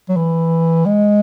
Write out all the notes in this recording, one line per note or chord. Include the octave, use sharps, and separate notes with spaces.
F#3
E3
G#3